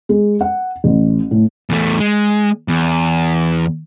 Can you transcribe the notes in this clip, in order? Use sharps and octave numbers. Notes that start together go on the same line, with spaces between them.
G#3
F#5
A1
A2
E2 A3
G#3
E2